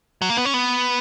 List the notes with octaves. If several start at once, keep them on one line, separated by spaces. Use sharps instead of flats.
F#3
A#3
B3
C#4
B3